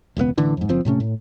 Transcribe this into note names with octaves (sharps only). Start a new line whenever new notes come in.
E1 C#2 D3 B3
A1 D3 E3
F2 G#2
F#1 F3 C4
A2 C3 A3 C#4
A2